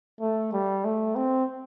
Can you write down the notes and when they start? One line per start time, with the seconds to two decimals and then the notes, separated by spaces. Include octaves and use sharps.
0.21 A3
0.53 G3
0.85 A3
1.15 C4